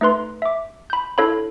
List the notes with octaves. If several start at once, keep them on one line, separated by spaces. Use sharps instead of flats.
A3 D#4 B4 C6
E5 D6
B5 G6
D4 E4 A4 C#5 F5 B5